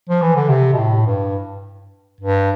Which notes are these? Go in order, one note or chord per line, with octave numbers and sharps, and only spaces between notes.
F3
E3
D3
C3
B2
A2
G2
G2